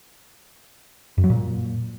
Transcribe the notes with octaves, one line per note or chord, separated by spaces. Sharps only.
F#2
F#3
A#2